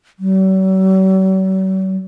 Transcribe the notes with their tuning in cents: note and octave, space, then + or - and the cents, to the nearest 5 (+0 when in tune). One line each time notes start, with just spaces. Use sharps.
F#3 +45